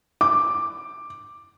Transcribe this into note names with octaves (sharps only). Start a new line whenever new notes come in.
D6